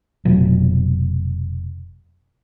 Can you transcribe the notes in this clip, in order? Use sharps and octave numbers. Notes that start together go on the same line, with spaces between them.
F1 B2 F#3